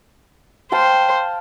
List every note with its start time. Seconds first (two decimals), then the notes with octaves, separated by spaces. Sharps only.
0.72 C5 F5 G5 A5